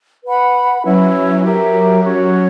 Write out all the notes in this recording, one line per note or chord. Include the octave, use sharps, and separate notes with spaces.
B4 F#5 B5
F#3 C#4 E4 B4
G4 A#4 E5
F#3 C#4 F#4 C#5